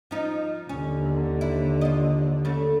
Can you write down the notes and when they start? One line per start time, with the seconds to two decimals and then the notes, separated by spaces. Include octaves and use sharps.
0.11 F3 D#4
0.69 D#2 D3 C#4
1.41 E4
1.81 F4 D#5
2.45 C#3 A3